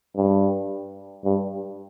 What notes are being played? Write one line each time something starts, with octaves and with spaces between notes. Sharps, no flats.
G2
G2